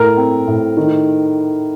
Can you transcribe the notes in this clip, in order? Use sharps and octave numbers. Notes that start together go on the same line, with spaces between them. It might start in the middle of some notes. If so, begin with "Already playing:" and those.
Already playing: A2 A#4
C4
A2
D#3